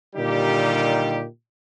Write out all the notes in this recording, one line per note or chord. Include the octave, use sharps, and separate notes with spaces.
A#2 D3 D#3 G3 D#4 G4